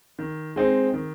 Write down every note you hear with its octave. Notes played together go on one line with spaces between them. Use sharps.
D#3
G#3 C4 D#4
D#3